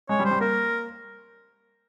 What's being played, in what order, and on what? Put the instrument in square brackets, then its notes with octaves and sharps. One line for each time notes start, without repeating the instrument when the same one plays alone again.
[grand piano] G#3 [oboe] C#5
[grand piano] G3
[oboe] C5
[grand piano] G3
[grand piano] A#3 [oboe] A#4